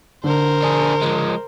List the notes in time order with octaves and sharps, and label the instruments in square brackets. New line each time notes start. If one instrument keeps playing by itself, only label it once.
[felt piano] D3 [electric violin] A#4 C5
[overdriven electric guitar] D4 G#4
F3 G#3